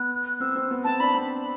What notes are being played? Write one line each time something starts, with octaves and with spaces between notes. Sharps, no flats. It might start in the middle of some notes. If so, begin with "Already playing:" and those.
Already playing: B3 F#6
C4 E6
C4
B3
C4 A5
D4 B5
C4